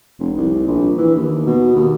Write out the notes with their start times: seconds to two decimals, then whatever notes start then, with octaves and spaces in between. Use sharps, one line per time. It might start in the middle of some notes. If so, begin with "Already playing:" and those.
0.20 F1
0.37 C2
0.67 A#1
0.98 E3
1.16 D#2
1.47 B2
1.76 D#2